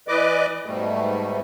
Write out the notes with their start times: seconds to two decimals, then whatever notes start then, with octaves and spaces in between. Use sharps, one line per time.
0.08 E3 B4 D5 D#5 D6
0.66 G#2 B2 G3 A3